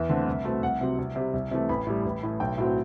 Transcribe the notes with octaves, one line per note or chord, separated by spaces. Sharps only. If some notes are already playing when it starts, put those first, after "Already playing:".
Already playing: E2 E5
D3 A3 C4
C2
B2 A3 C4
C2 F#5
C3 F#3 C4
C2
C3 G3
C2
C3 E3 A3
A1 B5
A2 G3
A1
A2 E3
B1 G5
A2 F#3 C4